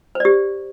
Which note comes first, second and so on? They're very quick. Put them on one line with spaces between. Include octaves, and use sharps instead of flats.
C5 D5 G4